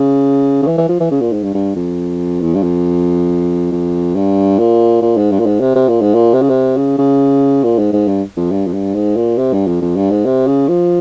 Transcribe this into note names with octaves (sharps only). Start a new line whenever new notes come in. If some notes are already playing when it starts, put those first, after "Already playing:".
Already playing: C#3
C#3
E3
E3
F3
E3
C#3
A#2
G#2
G2
G2
F2
E2
G2
F2
F2
G2
A#2
A#2
G#2
G2
A#2
G#2
C3
C3
A#2
G#2
A#2
C3
C#3
C3
C#3
C#3
A#2
G#2
G#2
G2
F2
G2
F2
G2
G#2
A#2
C3
G2
F2
F2
G2
G#2
C3
C#3
F3